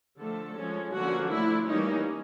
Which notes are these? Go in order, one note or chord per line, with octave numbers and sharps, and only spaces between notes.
D3 F3 A3 A4
F3 G#3 C#4
D3 F3 A#3 C#4 F#4
F3 A3 D4 E4
E3 G3 A#3 C#4 D#4